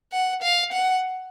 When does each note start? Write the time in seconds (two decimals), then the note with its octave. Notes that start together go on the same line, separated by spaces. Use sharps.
0.12 F#5
0.43 F5
0.73 F#5